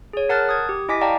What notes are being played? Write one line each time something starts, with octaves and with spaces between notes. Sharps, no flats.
G#4 C#5
A#4 F#5 A5 F6 F#6 A6
D#6 G#6
G4
E4 D#5 G#5 D6 A#6 B6
D5 F5 G5 A5 A#5 C#6